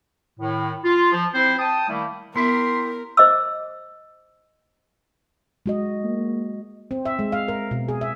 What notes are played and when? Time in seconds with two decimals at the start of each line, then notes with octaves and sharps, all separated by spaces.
0.40 A2 D#3
0.84 F4
1.12 F3
1.34 C4 E4 C5
1.59 G5 A5 D#6
1.89 D#3 G3 A3 A#3 E4
2.36 B3 E4 G4 A#4 E5 C6
3.17 C5 D#5 D6 E6
5.66 G#3 F#4 D#5
6.04 A#3
6.91 C4
7.06 E5
7.19 G#3
7.32 F5
7.48 A#4
7.71 B2
7.88 G#4
8.01 E5